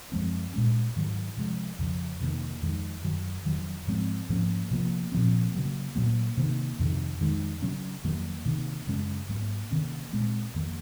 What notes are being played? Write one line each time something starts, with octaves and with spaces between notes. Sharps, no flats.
F#2 F3 G#3 C4
A#2 G#3 C#4
G#2 D#3 F#3
C3 F3 G#3
F2 C#3 F3
F2 C3 D#3 A#3
F2 D#3 G#3
F#2 D#3 F#3
F2 D#3 F#3
G#2 F3 G#3 C4
G#2 F3 A#3 C#4
C3 F3 A#3
A#2 F3 C4
C#3 F#3 A#3
A#2 F#3 A#3
C3 D#3 A#3
F2 C3 D#3
F2 D#3 G#3
C#3 F#3 C#4
F2 D#3 F#3 A#3
C3 D#3 A#3
F#2 C#3 G#3 C#4
G#2 F#3 A#3
C3 D#3 A#3 C#4
A#2 G#3 C4
F2 D#3 A#3